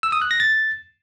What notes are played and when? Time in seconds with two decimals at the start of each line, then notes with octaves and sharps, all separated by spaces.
0.03 E6
0.12 D#6
0.22 F#6
0.31 A#6
0.40 A6